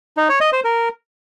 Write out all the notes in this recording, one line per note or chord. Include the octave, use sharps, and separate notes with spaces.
D#4
C#5
D#5
C5
A#4